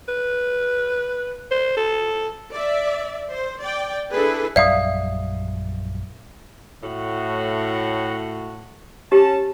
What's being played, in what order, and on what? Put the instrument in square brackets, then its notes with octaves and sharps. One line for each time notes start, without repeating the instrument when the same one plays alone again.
[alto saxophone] B4
C5
A4
[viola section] D5 E5
C5
D5 G5
D4 E4 G#4 A4 B4
[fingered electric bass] A#1 F#2 G3 [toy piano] D5 D#6 [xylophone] E5 F5
[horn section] A2 F#4
[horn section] C#4 A5 [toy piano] G4